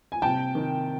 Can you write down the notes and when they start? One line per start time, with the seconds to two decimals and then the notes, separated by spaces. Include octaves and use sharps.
0.12 G#5
0.22 C3 G5 A5
0.55 D#3